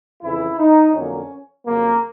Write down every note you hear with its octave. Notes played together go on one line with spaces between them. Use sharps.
F2 C#3 E3 E4
D#4
F2 D3 F#3 A#3 C#4
F2 C#3 F#3 A#3